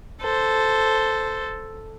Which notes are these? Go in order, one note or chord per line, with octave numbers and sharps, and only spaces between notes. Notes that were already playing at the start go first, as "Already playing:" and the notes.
A4 C5